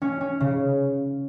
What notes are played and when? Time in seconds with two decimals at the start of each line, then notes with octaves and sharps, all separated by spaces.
0.02 C#4
0.21 C#4
0.40 C#3